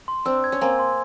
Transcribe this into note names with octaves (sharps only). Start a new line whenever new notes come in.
C6
C4 D4 E6
G#6
C#4
A#3 C4 G#5
C6